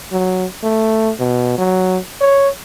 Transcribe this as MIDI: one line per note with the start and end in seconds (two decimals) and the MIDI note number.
0.12 0.46 54
0.63 1.12 57
1.20 1.57 47
1.58 1.98 54
2.21 2.49 73